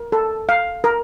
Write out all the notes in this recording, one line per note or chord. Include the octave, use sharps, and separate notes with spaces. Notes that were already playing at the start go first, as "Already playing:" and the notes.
Already playing: A#4
A4
F5
A#4